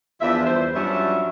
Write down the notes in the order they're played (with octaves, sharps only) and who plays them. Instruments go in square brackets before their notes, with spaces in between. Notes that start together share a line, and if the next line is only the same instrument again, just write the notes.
[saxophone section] E2 F3 D4 F4 E5
E2 G2 E3 C5
G2 F3 F#3 C#4 D4 E5